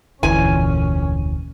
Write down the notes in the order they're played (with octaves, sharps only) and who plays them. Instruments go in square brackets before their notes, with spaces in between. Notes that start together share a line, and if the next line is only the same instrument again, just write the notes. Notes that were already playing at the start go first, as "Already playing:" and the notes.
[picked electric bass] F1 D2 [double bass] A#2 C#4 [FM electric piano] E3 [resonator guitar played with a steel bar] G#5